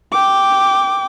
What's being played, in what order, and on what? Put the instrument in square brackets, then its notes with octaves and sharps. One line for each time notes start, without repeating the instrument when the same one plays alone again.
[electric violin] G5 D6